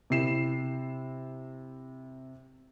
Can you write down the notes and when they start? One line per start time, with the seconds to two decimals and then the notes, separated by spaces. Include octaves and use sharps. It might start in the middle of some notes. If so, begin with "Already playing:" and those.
0.10 C3 E4 C7 E7